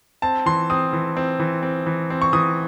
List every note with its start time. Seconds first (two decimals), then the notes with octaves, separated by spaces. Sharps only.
0.22 C4 A5
0.46 E3 C6
0.70 C4 D#6
0.93 E3
1.17 C4
1.40 E3
1.63 C4
1.86 E3
2.10 C4
2.22 C#6
2.33 E3 D#6